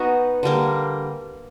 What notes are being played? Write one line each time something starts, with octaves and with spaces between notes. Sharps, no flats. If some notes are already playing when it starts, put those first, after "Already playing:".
Already playing: B3 D#4 F#4
D3 G3 A#3